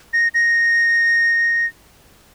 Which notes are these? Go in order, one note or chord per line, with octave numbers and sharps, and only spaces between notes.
A#6
A#6